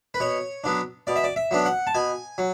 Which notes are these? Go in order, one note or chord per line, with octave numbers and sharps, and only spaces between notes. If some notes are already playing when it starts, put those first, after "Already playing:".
B4
B2 C#5
F#3 B3 D4
B2 D5
E5
D5
E5
F#3 B3 D4
F#5
A5
B2 G#5
F#3